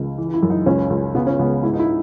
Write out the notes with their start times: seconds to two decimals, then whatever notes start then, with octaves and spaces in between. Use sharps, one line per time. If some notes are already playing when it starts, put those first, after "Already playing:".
Already playing: C#2
0.18 E3
0.34 E4
0.43 F#2
0.50 D#4
0.66 C#2 C#4
0.90 C#2
1.15 C#3 B3
1.27 C#4
1.39 C#2 B3
1.63 G#2 E4
1.74 D#4
1.79 E4